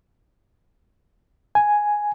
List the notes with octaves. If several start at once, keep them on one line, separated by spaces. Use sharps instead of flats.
G#5